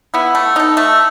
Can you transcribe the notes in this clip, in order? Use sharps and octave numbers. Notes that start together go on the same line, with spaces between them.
B3 E4
A3
D#4 A4
A3